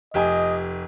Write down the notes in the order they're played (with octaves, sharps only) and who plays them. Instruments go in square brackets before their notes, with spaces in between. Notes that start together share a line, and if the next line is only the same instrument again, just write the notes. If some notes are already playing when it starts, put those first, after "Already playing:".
[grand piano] F1 G4 G#5 [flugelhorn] D#5